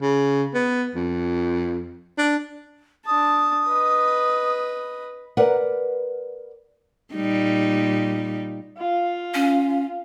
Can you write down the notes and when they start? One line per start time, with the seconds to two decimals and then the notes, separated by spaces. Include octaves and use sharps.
0.02 C#3
0.54 B3
0.95 F2
2.18 D4
3.06 D4 A5 D#6
3.67 B4 D#5
5.37 A#4 B4 D5 F#5
7.14 A#2 G3 D#4
8.77 F4
9.34 C#4